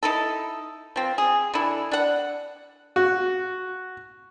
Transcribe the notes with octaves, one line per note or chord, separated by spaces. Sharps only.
D#4 E4 A4
F3 C4
G#4
D3 E4
D4 F#5
F#4